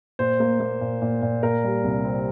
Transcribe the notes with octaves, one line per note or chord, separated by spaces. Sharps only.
A#2 C5
A#3
A#3
A#2
A#2
A#2
A#2 A#4
G3
C2
C4